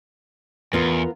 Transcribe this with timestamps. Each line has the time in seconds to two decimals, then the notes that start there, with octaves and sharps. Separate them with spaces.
0.73 E2 B3 F4 A#4